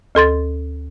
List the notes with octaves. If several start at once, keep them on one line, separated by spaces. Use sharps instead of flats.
D2 A4 C6 A6